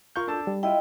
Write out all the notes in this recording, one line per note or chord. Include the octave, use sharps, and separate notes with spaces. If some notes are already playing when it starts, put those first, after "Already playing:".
F4 A#4 F5 C#6 G6
D4 A4 A5
G3
E4 F4 D#5 G5